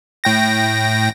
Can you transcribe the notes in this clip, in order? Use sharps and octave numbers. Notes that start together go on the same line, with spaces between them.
A2 G5 A#6